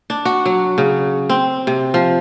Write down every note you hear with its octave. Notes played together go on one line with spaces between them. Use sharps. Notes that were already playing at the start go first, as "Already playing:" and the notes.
D4
F#4
F#3
C#3
C4
C3
F3